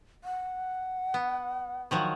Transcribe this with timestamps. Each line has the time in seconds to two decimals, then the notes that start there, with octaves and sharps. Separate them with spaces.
0.24 F#5
1.14 B3
1.91 D#3 F3 F#3